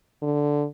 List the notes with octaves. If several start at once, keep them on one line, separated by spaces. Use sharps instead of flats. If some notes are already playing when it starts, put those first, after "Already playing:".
D3